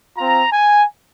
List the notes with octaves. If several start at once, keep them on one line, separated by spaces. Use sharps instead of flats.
C4 F4 A#5
G#5